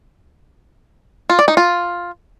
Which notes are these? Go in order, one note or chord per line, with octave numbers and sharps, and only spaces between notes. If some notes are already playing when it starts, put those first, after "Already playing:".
F4
D5
D#4
F4